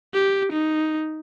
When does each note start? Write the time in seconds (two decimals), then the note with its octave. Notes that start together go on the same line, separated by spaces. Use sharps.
0.14 G4
0.52 D#4